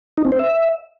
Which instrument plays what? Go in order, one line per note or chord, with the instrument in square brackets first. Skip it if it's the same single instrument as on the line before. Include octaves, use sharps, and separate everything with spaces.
[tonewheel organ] D#4
C4
C5
E5